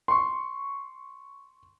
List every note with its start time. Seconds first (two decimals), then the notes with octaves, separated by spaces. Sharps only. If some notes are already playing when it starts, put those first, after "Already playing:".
0.08 C6 C#6